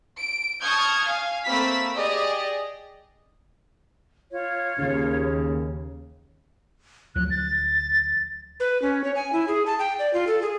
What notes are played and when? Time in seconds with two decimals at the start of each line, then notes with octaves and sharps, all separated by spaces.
0.19 D7
0.61 A5 C#6 D#6 F6 G6 G#6
1.05 F5 G#5
1.45 A3 A#3 C4 B5 E6 B6
1.95 G4 G#4 D5 D#5
4.32 F4 C#5
4.79 D#2 C#3
7.15 D2 F3 F#3 F#6
7.30 A6
8.60 B4
8.82 C#4
9.04 C#5
9.15 G#5
9.33 E4
9.48 G#4
9.66 A5
9.79 G5
9.99 D5
10.13 F4
10.27 A4
10.42 G#4